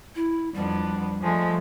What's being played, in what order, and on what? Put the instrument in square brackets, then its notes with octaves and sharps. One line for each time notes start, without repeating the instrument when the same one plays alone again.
[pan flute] E4
[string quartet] F2 B3 D4 [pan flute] G3
[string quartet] F3 G#3 A3